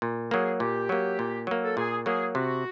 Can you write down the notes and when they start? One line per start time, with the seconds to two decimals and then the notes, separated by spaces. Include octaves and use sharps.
0.02 A#2
0.31 F#3 A#3 G#4
0.60 A#2 G4
0.89 F#3 A#3
1.19 A#2
1.47 F#3 A#3
1.63 A4
1.77 A#2 G#4
2.06 F#3 A#3 G#4
2.35 C3 F#4